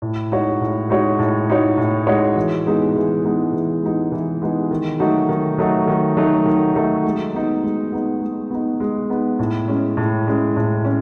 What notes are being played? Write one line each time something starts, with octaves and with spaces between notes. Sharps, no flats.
A2
G#3 D#4 F#4 C#5
A2
G#3 D#4 F#4 C#5
A2
G#3 D#4 F#4 C#5
A2
G#3 D#4 F#4 C#5
E3
G#3 B3 D#4 G#4
E3
G#3 B3 D#4 G#4
E3
G#3 B3 D#4 G#4
E3
G#3 B3 D#4 G#4
D#3
F#3 A3 D#4 F#4
D#3
F#3 A3 D#4 F#4
D#3
F#3 A3 D#4 F#4
D#3
F#3 A3 D#4 F#4
G#3
B3 D#4
G#3
B3 D#4
G#3
B3 D#4
G#3
B3 D#4
A2
G#3 C#4
A2
G#3 C#4
A2
C#4